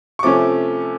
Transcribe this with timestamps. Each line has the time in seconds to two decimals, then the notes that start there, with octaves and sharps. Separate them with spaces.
0.19 C#6
0.23 C3 F3 A3 C#4 D6